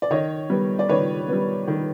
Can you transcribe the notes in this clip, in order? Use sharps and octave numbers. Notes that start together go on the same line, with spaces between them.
D5
D#3 C#5 D#5
G3 B3
D5
D#3 B4 C#5
G3 B3
D#3